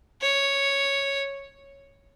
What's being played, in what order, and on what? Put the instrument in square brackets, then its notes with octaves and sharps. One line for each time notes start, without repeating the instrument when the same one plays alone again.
[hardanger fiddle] C#5